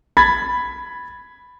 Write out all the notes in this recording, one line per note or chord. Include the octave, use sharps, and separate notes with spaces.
B5 G#6 A6 B6